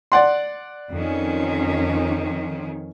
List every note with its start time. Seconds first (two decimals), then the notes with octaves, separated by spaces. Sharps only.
0.12 D5 F#5 C6
0.92 F2 D#3 C#4